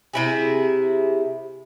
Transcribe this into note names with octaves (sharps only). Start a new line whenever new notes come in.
C3 E4 G#4